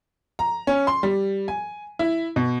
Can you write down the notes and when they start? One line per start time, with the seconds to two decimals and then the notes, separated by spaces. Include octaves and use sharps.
0.39 A#5
0.67 C#4
0.87 C6
1.03 G3
1.48 G#5
1.99 E4
2.36 B2